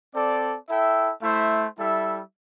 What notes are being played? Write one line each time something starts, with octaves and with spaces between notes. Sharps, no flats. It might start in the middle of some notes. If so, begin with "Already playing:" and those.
C4 A4 D5
E4 A4 E5 G5
A3 E4 C5 E5
G3 E4 A4 E5